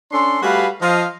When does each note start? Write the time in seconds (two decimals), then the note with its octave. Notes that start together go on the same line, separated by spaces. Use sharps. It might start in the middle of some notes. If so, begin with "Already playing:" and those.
0.12 C#4 D4 A4 C6
0.42 G3 A3 F#4 G#4 B4 F5
0.81 F3 D#5 F5